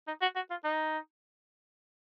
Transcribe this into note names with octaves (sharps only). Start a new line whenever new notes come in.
D#4
F#4
F#4
F4
D#4